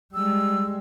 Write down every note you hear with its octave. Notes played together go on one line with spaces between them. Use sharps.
G3 G#3 E6